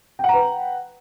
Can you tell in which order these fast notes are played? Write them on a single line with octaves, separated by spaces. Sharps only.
G5 F#5 A#5 B4